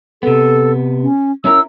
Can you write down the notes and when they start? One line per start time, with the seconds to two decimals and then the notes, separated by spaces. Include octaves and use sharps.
0.23 C3 B3 A4
1.02 C#4
1.45 C#4 E4 A#4 E6